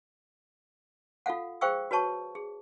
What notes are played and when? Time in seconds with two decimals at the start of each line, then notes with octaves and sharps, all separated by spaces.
1.26 F4 A4 F5 F#5
1.61 G#4 C5 F5 G5 C#6 E6
1.91 F#4 B4 C#5 A5 C#6
2.35 G#4